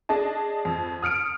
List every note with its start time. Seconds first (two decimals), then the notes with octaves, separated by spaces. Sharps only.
0.09 D4 G#4 D#5 A5
0.65 F2
1.02 D#6 F6 C#7 D7